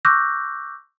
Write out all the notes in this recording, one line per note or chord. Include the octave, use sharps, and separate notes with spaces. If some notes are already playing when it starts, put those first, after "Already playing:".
C#6 D6 E6 F#6 G6 A#6